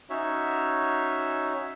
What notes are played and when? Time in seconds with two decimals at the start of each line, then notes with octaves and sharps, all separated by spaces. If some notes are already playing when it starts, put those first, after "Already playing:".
0.10 C#4 D#4 F#4 C#5 E5